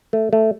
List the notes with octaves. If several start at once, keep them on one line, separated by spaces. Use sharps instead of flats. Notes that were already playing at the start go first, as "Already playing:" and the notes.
A3
A3